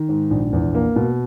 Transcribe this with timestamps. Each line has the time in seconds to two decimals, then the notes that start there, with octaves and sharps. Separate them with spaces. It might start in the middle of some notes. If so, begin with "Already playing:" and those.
Already playing: D#3
0.09 G#2
0.31 A#1
0.53 E2
0.75 A#3
0.96 B2